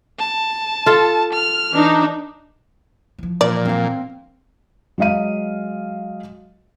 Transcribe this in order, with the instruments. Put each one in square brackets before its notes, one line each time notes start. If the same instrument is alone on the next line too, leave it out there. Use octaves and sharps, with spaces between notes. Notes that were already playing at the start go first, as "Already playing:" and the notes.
[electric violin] A5
[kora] F4 A4
[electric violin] F6
[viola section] E3 D4 D#4
[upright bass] E3 F3
[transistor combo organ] A#2 [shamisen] D5
[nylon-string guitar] C4 F5
[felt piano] F#3 G#3 D#5 F5 D#7